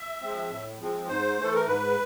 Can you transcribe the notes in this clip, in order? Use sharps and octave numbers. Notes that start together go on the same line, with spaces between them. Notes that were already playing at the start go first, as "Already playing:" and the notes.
Already playing: E5
F3 G#3 C4
A2
F3 G#3 C4
G#2 C5
E3 A3 A4
A#4
G#2 B4